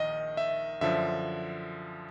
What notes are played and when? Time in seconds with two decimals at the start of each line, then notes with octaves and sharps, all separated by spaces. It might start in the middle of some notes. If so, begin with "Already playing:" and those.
Already playing: A#1 D#3 D#5
0.37 E5
0.81 F#2 D3 F3 E5